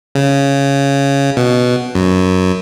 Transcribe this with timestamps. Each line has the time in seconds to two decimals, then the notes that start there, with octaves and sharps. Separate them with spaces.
0.15 C#3
1.37 B2
1.95 F#2